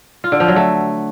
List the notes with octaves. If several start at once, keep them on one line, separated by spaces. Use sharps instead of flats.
F4
D3
F3
F#3
A3